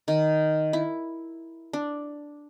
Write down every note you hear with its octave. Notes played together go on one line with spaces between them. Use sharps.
D#3
E4
D4